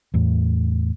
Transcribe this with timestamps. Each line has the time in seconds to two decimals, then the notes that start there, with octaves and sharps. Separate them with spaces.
0.14 E2 A2